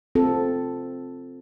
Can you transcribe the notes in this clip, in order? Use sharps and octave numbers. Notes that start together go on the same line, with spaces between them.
C4 F4 A4